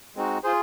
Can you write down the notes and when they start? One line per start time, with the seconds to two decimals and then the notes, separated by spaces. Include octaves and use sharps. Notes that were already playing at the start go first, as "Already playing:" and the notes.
0.16 G#3 C4 D#4 F#4
0.44 F4 G#4 C5